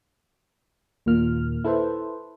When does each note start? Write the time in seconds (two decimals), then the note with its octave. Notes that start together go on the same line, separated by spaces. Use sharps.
1.06 D#2 A#2 A#3 F6
1.64 E4 A4 B4 C5